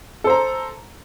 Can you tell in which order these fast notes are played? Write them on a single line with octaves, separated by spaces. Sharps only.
A4 C5 A#5